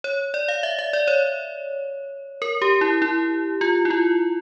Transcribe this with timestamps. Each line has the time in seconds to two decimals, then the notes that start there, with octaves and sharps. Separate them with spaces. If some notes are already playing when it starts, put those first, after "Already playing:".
0.04 C#5
0.34 D5
0.48 F5
0.63 E5
0.79 E5
0.93 D5
1.07 C#5
2.42 A#4
2.62 G4
2.81 E4
3.02 E4
3.61 F4
3.85 E4
3.90 F4